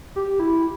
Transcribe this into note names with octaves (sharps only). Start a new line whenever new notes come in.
G4
E4